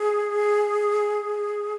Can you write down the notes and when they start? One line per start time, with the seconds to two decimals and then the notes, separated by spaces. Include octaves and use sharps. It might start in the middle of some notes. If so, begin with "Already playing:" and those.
Already playing: G#4